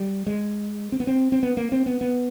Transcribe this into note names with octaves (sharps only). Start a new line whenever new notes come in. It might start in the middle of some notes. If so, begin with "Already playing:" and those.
Already playing: G3
G#3
C4
B3
C4
C4
B3
A#3
C4
B3
B3